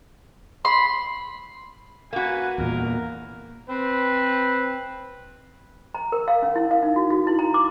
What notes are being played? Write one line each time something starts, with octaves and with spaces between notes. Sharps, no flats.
B5 C6
A#3 F#4 B4 G#5
E2 A#2 A#4
C4 B4
A#5
A#4
F5
C#4
E4
F5
D#4
F#4
F#4
E4
A#5
D6